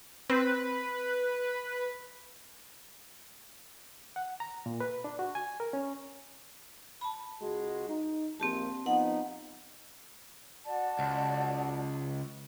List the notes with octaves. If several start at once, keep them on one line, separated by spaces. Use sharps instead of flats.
C4 B4
F#5
A#5
A#2
B4
D4
F#4
G#5
A#4
C#4
A5 B5
C#2 G#3 F#4
D#4
A#1 G2 C4 G4 A5
F3 B3 D#4 F#5
F#4 D5 A5
C#2